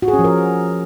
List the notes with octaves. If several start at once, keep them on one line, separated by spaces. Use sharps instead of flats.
F#4
G#4
C#4
F3
A#4